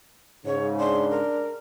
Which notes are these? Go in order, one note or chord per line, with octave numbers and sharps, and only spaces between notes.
G#2 C#3 C#5
D4 C6
A#4